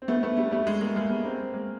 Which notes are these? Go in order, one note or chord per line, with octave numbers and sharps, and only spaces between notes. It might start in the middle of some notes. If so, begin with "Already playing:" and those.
C4
A3 B3
A3 B3
G3 A3
G3 A3
G#3
G#3 A#3
G#3 A#3
A3 B3
A#3 C4
G#3 A#3